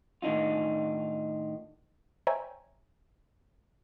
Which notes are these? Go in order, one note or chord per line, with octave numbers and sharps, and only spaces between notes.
A2 D#3 D4 D#4 F4
C5 C#5 E5 G5 G#5 A#5